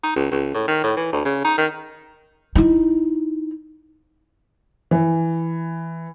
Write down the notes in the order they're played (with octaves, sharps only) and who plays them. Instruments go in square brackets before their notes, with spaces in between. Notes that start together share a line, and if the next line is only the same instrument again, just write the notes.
[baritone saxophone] D#4
C#2
C#2
A2
D#3
A2
E3
D2
C#3
D#4
D#3
[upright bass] D#4 E4
[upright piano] E3